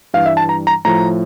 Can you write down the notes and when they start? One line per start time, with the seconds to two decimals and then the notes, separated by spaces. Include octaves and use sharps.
0.13 G2 E3 G3 F5
0.26 E5
0.37 A5
0.49 A#5
0.67 A#5
0.85 A2 F3 A#5